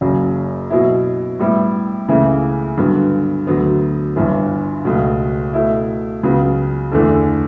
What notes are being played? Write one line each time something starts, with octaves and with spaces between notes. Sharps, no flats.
F#1 F#2 C#3 F#3
B2 F#3 B3 E4
A2 G3 B3 E4
C#2 C#3 E3 A3 E4
G2 D3 F#3 B3
D2 D3 F#3 B3
G1 G2 E3 B3
C#2 B2 A3
B2 A3 E4
C#2 C#3 F#3 B3
E2 D3 A3 D4 A4